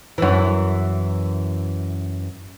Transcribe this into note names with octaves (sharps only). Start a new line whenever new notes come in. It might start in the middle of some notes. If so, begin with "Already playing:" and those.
F#2 E3